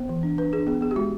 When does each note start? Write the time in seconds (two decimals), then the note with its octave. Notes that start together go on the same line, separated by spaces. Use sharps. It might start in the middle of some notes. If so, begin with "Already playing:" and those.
Already playing: B3 C5
0.09 E3
0.23 D4
0.38 D4 B4
0.53 D4 G#4
0.67 B3 G#4
0.81 B3 G#4
0.91 G4
0.96 G#3 F#4